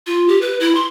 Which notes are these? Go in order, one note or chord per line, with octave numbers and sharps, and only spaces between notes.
F4
G4
B4
E4
C6